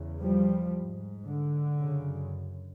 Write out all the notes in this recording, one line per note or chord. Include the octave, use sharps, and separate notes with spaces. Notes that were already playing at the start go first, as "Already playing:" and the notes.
Already playing: E2 C#3
F3 G3
G#2
D3
F#2 C#3